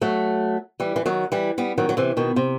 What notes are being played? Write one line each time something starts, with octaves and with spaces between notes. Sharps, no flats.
F#3 A3
E3 G3
E3
D#3 F#3
E3 G3
G3 B3
D#3 F#3
F#3
C3 E3
B2 D#3
C3